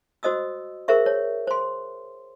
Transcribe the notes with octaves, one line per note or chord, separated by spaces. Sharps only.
F#4 C5 D#5 D#6 E6
G#4 A#4 C5 E5 C#6
C#5
C5 C6